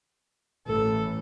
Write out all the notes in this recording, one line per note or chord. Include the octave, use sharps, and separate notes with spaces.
A1 A2 E3 A4